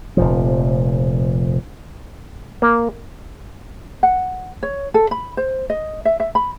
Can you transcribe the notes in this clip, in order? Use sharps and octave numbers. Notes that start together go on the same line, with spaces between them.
F1 A#2 F3
A#3
F#5
C#5
A4
B5
C5
D#5
E5
E5
B5